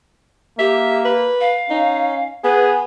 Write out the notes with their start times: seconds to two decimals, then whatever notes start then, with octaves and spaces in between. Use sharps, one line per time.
0.59 A#3 G4 E5
1.05 B4
1.41 F5
1.70 C#4 D#4
2.44 B3 G#4 B4